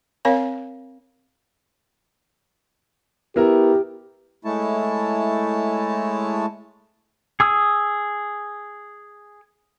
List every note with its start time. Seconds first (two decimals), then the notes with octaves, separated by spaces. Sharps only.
0.25 C4 A#4 C#5 F5 G#5
3.36 B3 E4 G4 A#4
4.45 G#3 A3 E4 C#5 A5
7.40 G#4 D#6 E6